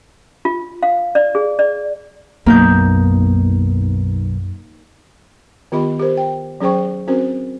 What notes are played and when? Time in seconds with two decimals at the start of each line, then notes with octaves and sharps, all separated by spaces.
0.45 F4
0.83 F5
1.15 D5
1.35 G#4
1.59 D5
2.46 B1 F#2 A#3 B3 D#4 G6
5.72 D#3 B3 F4 G4 D#5 B5
5.99 G4 A#4 C5
6.17 G5
6.61 F#3 C#4 G#4 C5 G5 C#6
7.08 C4 C#4 F#4 A#4 C5